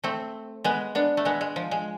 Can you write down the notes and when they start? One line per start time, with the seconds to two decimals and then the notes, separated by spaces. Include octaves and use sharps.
0.04 A3 C4
0.64 G#3 B3
0.95 B3 D4
1.17 A3
1.25 G#3 B3
1.41 G#3
1.56 F3
1.71 G#3